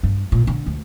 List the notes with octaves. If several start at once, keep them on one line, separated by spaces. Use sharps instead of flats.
G2
A#2
D3
D2